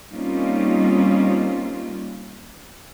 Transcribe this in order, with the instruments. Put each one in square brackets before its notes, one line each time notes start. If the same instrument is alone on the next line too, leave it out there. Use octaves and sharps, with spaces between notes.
[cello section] G3 A#3 C4 C#4 D#4 F4